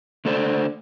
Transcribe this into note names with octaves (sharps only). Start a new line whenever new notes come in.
D3 A3 A4 C5 D5